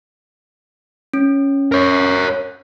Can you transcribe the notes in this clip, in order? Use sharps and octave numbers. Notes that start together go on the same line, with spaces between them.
C#4
A#4 C#5